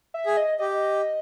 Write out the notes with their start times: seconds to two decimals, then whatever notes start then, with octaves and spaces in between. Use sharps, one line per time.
0.14 E5
0.26 G#4
0.37 D#5
0.59 G4 D#5